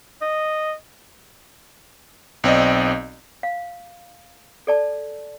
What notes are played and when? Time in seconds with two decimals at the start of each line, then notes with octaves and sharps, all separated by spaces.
0.21 D#5
2.44 B1 C4 D5 D#5
3.43 F5
4.67 A4 D5 A5